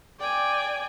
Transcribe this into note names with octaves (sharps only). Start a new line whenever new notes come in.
D5 G5 G#5